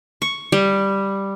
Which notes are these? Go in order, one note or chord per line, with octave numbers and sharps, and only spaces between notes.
C#6
G3